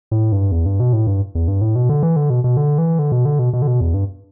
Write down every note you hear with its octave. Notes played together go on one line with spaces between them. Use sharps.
A2
G2
E2
G2
B2
A2
G2
E2
G2
A2
B2
D3
E3
D3
B2
B2
D3
E3
D3
B2
D3
B2
B2
D3
B2
E2
G2